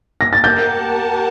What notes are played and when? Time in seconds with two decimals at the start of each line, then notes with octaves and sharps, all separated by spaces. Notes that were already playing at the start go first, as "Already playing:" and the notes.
0.21 A#6
0.33 A6
0.44 G4 A#4 F#5 A5 G6